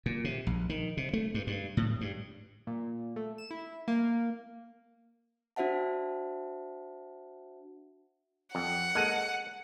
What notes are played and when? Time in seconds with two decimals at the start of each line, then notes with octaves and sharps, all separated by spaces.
0.06 A#2
0.24 C3
0.47 A#1
0.70 D#3
0.97 C3
1.13 A3
1.34 G2
1.47 G2
1.77 A2
2.01 G2
2.67 A#2
3.16 A3
3.38 E7
3.51 E4
3.88 A#3
5.56 D4 F#4 C5 E5 F#5 A5
8.55 F2 F#5
8.95 G#3 A#3 A4 F#6 D#7